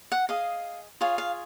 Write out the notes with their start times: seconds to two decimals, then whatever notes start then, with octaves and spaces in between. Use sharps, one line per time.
0.12 F#5
0.29 G#4 D#5 F5
1.01 F4 G#4 C#5 F5
1.18 F5